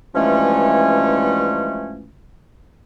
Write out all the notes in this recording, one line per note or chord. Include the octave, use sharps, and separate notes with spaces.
G2 E3 F3 G#3 A3 C#4